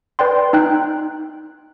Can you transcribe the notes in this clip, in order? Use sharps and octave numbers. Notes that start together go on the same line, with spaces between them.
B4 D5 G5 C6
D#4 G5 F#6